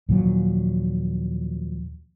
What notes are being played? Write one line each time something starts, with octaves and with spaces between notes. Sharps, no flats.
D#2 A#2 F3 F#3